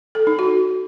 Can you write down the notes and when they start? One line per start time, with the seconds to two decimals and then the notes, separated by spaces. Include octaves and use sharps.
0.15 A4
0.27 D#4
0.39 F#4